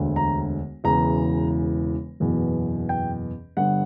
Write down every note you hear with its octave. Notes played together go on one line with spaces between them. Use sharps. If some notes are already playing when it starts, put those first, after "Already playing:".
Already playing: E1 D2 D3
A#5
E1 E2 C#3 E3 A#5
F#1 E2 B2
G5
G1 G2 D3 F#5